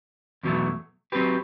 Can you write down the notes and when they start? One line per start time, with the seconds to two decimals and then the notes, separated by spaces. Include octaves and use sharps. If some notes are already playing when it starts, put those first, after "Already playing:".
0.43 E2 B2 F#3 A3
1.12 F#3 C4 G4 B4